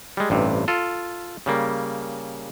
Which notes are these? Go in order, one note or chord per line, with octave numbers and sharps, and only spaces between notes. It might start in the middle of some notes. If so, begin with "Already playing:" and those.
G3 G#3
A1 G2 C3
F4 A4
C#3 G3 A#3